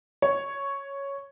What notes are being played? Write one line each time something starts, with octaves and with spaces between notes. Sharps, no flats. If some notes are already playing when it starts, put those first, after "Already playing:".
C#5